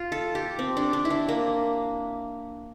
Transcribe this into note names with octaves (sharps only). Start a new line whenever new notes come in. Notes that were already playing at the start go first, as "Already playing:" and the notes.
Already playing: F4
A4
G4
C4
D4
D4
E4
D4
A#3